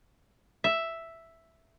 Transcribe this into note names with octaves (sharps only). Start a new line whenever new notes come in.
E5